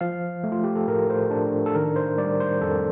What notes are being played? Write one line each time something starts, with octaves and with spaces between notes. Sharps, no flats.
F3 F5
A3
F4
G4
A4
A2 A#4
C5
D4
A4
D#3 A#4
C5
G3 D5
C5
F2 A4